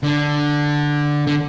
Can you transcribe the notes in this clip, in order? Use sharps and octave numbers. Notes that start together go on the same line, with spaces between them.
D3
D3